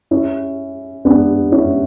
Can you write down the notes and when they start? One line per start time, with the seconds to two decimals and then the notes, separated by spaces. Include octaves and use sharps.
0.11 C#4 E4
1.05 B3 D4
1.52 C#4 E4